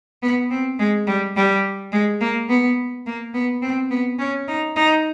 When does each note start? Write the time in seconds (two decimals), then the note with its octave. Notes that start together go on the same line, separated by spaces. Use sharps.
0.23 B3
0.50 C4
0.79 G#3
1.07 G3
1.36 G3
1.92 G#3
2.21 A#3
2.49 B3
3.06 A#3
3.34 B3
3.62 C4
3.90 B3
4.19 C#4
4.48 D#4
4.76 D#4